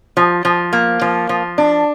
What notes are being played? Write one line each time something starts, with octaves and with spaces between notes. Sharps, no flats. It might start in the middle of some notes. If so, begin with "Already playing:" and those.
F3
F3
A#3
F3
F3
D4